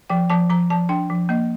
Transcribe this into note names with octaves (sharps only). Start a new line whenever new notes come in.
F3 G5
F3 A5
F3 A#5
F3 A5
D4 G5
F3
A#3 D#5